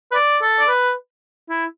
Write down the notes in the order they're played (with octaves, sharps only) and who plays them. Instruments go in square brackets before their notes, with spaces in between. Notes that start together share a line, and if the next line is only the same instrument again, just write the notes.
[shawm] B4
D5
A4
D5
B4
E4